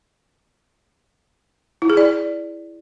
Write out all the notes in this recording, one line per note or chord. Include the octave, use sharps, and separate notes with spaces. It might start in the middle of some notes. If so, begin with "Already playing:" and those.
E4
G#4
D5